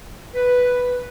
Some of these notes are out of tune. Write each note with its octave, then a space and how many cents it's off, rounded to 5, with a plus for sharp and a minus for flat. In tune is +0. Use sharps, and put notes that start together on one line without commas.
B4 +0